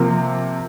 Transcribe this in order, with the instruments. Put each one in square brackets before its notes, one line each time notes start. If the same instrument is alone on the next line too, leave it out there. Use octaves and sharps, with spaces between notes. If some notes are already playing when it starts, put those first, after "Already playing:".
Already playing: [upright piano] C3 F3 A#3